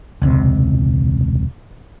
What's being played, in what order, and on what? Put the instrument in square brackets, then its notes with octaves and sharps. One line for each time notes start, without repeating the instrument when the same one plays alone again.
[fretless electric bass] E1 C#2 C3